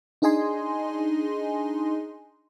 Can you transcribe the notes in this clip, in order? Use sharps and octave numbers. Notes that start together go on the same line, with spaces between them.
D4 D#4 G#4 D#5 G#5 C6